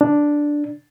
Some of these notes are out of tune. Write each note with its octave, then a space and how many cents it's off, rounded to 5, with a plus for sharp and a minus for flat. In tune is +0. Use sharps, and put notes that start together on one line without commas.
D4 +0